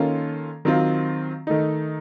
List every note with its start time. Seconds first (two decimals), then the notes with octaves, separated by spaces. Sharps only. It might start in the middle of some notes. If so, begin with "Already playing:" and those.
Already playing: D#3 A#3 C#4 F4 A4
0.65 D#3 F#3 C4 F4
1.47 D#3 A3 D#4